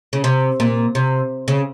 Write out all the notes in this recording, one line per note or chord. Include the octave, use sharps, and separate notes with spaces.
C#3
C3
A#2
C3
C#3